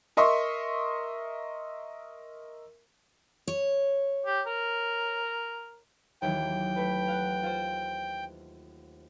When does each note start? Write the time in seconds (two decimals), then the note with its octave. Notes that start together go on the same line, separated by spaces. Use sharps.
0.17 A#4 D#5 E5 C6 C#6
3.47 C#5
4.26 G4
4.47 A#4
6.22 D#2 E3 F#3 G5
6.76 A3 B4
7.08 F5 F#5
7.43 F4 C5